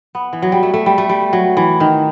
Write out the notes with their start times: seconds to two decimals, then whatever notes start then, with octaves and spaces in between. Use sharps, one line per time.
0.15 B3
0.33 E3
0.42 F#3
0.52 G3
0.63 A3
0.74 A3
0.86 G3
0.98 A3
1.09 G3
1.33 F#3
1.57 E3
1.80 D#3